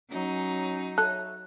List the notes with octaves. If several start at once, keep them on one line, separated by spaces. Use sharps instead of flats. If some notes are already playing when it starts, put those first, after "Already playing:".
F#3 C#4 D#4
A4 C#5 E5 F#6